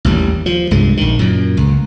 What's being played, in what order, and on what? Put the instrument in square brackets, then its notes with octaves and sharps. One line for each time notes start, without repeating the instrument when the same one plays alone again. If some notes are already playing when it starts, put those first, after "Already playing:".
[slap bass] A1 D#2 G3
F3
C2 G2 G#3
A#1 D#3
F#2 A#2
C#2